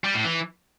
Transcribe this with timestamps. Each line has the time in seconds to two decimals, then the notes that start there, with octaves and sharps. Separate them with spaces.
0.04 G3
0.14 A2
0.25 E3